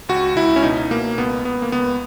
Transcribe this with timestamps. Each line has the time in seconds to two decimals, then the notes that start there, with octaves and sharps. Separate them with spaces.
0.09 C#2 F#4
0.36 C#2 E4
0.56 C#4
0.63 B2 D#4
0.91 B2 A#3
1.18 C#2 B3
1.45 C#2 B3
1.62 A#3
1.72 C#2 B3